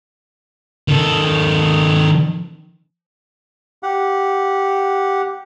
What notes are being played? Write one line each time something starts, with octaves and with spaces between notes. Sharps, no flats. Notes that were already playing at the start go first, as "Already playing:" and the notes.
D#3 A4
G4 F#5